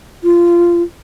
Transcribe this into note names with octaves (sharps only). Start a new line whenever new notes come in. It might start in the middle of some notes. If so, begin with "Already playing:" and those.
F4